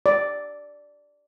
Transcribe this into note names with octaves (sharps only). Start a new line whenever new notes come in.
D5